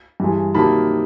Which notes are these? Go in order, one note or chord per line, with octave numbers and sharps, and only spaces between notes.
G2 E3 G#3
C3 D#3 F#3 A#3 A5 B5